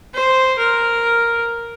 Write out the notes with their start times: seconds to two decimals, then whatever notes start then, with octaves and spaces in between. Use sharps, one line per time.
0.13 C5
0.59 A#4